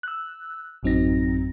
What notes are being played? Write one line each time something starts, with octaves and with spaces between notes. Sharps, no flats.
E6 F#6
A1 F#2 F#3 C4 D#4 A#6